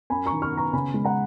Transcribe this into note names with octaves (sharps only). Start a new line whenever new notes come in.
F#2 G#5 B5
A#5 C#6
D#3
C#6 F6
B3
A#5 C#6
C#3 G#5 B5
G#3
F#5 A#5